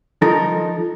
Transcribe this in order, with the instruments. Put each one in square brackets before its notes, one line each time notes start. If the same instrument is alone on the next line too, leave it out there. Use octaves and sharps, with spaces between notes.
[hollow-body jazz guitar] F3 D#4 A4 A#4